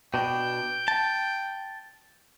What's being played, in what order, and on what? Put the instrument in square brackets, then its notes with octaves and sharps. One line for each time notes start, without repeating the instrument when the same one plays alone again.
[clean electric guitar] B2 D4 [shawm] G5
[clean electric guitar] A5